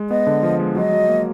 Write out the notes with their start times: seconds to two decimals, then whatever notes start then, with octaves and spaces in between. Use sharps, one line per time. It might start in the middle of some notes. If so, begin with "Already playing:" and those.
Already playing: G#3
0.10 B3 D#5
0.27 D3
0.43 F3
0.60 G#3
0.76 F#3 D#5
0.92 F#3
1.09 A#3